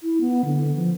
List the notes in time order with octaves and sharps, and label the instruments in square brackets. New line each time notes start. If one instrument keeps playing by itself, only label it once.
[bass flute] E4
B3
D3
F3